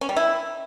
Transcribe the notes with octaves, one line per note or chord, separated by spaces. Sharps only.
C#4
G3
E4